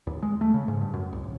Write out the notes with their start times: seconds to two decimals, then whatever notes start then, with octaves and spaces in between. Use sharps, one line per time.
0.07 D#2
0.22 G#3
0.41 A3
0.54 C#3
0.68 G#2
0.81 G2
0.94 F#2
1.12 C2
1.24 D#1